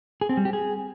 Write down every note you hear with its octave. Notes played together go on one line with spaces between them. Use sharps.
G#4
C4
G3
G4
G#4